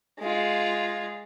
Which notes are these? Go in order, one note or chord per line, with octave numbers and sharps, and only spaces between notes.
G#3 F4